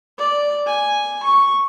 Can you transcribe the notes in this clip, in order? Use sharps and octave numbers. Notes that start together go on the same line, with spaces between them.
D5
G#5
C#6